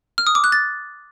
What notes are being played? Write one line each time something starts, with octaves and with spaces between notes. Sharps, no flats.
F6
D#6
D6
F#6
A6